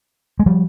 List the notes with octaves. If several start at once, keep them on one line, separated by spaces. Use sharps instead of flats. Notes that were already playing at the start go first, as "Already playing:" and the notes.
G#3
F3 G3